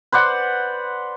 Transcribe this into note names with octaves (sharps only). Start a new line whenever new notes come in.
B4 C5 D5 F#5